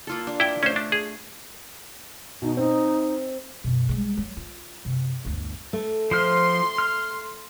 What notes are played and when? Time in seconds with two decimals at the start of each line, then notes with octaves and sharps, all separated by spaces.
0.07 A#3 F4 A4
0.27 D4
0.40 E4 G5
0.63 A3 C#4 C5
0.76 D4
0.92 G#4
2.42 B2 D#4
2.57 C4 D#4
3.64 F#2 B2
3.89 G3 G#3
4.17 F#3
4.37 F4
4.85 F#2 C3
5.25 G1 D2
5.73 A3
6.11 F3 C5 C6 F6
6.78 F6